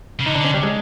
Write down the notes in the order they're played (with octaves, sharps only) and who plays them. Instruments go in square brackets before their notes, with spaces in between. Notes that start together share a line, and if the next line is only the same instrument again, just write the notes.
[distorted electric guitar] C#3
[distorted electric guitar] D3 [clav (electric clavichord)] D#4
[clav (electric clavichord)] D4
C#4
G3
G#3